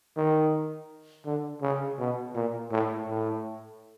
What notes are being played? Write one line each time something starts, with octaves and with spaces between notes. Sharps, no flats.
D#3
D3
C#3
B2
A#2
A2
A2